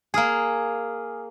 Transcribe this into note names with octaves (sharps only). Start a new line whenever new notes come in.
A#3 G#4 G#5 D#6 F6